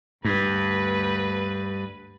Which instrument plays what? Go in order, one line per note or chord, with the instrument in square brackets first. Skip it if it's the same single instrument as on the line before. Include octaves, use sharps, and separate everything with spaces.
[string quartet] D2 B4 B5 [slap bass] G2